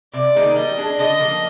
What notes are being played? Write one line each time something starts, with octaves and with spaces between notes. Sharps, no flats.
C3 D5
D#3 A#3 D#4 G#4
G3 D#5
D4 G#4
D3 D#5
F3 A#3